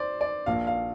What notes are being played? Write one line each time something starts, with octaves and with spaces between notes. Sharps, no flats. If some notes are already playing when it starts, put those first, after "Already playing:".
Already playing: C5 D5
D5
A#1 A#2 F5
F5